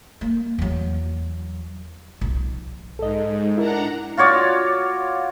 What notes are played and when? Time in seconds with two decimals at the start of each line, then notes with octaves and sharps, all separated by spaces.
0.21 A#3
0.58 E2 F#3
2.21 B1 F3
2.99 G#2 A4 D#5
3.58 D4 E4 A#4 F#5 A#5
4.17 F4 F#4 C#5 D5